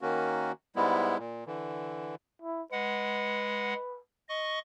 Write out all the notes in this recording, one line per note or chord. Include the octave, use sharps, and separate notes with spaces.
D#3 A#3 C#4 F#4
G#2 G3 G#3 B3 E4
A#2
D3 E3
E4
G#3 B4 F#5
D#5 C#6